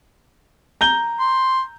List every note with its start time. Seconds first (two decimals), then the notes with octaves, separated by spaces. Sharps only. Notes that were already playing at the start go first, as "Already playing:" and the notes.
0.81 A#5 G6 G7
1.19 C6